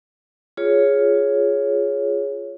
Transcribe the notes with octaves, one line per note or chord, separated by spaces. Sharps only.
F4 G#4 C#5